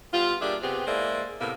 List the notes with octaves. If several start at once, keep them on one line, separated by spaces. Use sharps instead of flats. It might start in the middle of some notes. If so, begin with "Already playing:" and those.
G3 B3 F4
G3 A#3 D4 G#4 E5
C3 B3 C4 G4 G#4
G#3 A#3 E4 C5 D5
A2 C3 A#3 B3